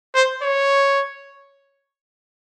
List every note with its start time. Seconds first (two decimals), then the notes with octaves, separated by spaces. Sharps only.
0.14 C5
0.43 C#5